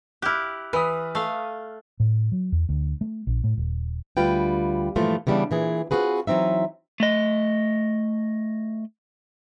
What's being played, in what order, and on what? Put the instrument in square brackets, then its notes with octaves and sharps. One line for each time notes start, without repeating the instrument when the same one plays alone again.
[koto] E4 G4 [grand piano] F6 F#6
[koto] E3 [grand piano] B4 D#6
[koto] A3 F5
[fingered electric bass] A2
F#3
E2
D2
A3
A#1
A2
D#1
[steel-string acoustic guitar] D2 G3 F4 B4 G5
G2 A#2 E3 F3 A3 F4
C#3 E3 G3 G#3 B3 D4
A#2 E3 G#4
C4 D#4 F4 F#4 G#4 B4
E3 F#3 C4 D#4 E5
[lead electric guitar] A3 D#5